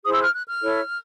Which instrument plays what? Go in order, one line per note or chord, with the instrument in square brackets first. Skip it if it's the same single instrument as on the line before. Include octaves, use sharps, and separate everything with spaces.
[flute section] E4 G#4 C5 D#6
E6
F#6
F6
F#6
F6
E4 A4 C#5